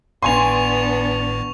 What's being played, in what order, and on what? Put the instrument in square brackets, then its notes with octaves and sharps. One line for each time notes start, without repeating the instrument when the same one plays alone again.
[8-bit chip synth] G#1 A2 [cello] B3 D4 [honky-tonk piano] G#5 C6 [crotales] C#6 F7